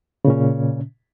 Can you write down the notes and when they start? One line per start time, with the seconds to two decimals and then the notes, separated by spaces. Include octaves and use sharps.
0.25 C#3
0.27 A#2
0.30 C#4